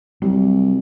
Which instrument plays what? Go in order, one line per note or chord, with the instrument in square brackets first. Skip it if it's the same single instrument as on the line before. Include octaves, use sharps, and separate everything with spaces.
[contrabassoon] C2 [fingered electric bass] F#3 G3